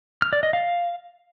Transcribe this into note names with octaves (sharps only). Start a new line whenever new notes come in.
F6
D5
D#5
F5